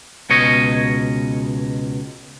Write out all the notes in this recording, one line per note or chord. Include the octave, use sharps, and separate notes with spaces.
C#2 B2 C#5 D#5